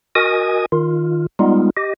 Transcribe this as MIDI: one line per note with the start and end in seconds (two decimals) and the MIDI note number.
0.15 0.66 66
0.15 0.66 70
0.15 0.66 75
0.15 0.66 80
0.15 0.66 87
0.72 1.26 51
0.72 1.26 65
1.39 1.70 55
1.39 1.70 56
1.39 1.70 59
1.39 1.70 63
1.39 1.70 65
1.77 1.94 67
1.77 1.94 75